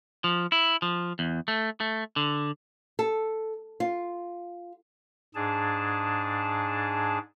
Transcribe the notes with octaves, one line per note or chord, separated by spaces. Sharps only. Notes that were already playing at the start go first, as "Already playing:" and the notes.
F3
E4
F3
E2
A3
A3
D3
A4
F4
G#2 D4 G#4 A5